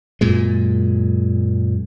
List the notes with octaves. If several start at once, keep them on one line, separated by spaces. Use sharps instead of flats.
F#2 A#2 G#3